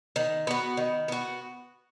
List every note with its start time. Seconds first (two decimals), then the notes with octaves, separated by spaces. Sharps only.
0.16 D#3
0.47 B3 F#4
0.77 D#3
1.08 B3 F#4